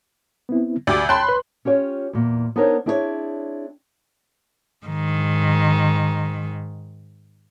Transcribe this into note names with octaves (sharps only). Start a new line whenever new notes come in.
B3 C4 E4
D2 F#4 G4 D5 D6
C#5 G5 A5 B5 C6 F#6
B4
C#4 F4 G4 C#5
E2 A#2
B3 D4 D#4 A#4 C5 C#5
C4 D4 E4 G#4 B4 C#5
G#2 D#3